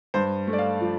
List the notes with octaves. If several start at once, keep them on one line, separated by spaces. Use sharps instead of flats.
G2 C5
A3
D5
F5
F3